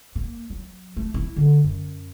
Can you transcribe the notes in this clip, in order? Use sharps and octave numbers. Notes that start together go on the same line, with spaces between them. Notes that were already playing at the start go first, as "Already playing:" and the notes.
A#3
F#3
A3
E4
D3
F#2